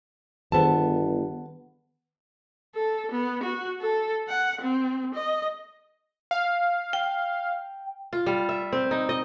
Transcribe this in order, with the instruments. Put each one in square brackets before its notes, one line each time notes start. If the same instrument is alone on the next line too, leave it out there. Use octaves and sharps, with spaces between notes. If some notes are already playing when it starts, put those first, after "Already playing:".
[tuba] G1 [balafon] D#3 G#4 C5 [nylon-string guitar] B3 A5
[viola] A4
B3
F#4
A4
F#5
C4
D#5
[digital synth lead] F5
[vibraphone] G5
[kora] F4
G3
E5
C4
D#4
D#5